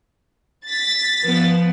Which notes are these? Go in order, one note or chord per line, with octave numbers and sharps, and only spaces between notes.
A6 B6
F3 B3